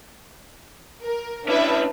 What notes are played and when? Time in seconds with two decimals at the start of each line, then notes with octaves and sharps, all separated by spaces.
1.03 A#4
1.48 C#4 D4 E4 B4 E5